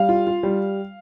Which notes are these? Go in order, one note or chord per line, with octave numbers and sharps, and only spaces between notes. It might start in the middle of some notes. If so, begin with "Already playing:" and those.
Already playing: G3 F5
F4
F4
G3